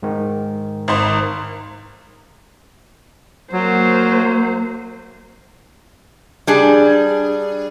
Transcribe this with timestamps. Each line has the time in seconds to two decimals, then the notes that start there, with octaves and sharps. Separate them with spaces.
0.03 G#2 D#3
0.88 G#1 C5
3.53 F#3 A#3 C5
6.47 G3 D4 G#4